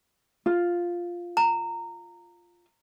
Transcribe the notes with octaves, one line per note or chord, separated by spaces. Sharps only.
F4
A#5